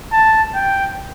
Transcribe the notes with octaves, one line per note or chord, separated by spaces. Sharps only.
A5
G5